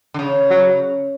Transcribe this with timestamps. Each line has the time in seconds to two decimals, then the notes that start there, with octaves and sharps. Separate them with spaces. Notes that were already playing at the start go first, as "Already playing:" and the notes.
0.14 D3
0.19 C#3
0.50 F#3